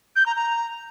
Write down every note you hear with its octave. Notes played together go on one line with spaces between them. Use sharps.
G6
A#5
A#5